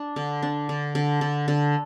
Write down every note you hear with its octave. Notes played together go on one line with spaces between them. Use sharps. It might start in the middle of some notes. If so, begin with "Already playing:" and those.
Already playing: D4
D3
D4
D3
D3
D3
D3